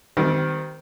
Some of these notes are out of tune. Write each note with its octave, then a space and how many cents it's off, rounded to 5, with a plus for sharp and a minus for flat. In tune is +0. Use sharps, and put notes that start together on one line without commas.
D#3 +0 G3 -30 C4 -25